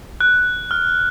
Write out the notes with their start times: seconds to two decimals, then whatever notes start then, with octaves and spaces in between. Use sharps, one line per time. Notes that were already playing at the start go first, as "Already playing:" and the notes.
0.21 F#6
0.71 F6